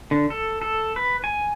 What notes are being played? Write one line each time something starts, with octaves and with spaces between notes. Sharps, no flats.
D3
A4
A4
B4
G#5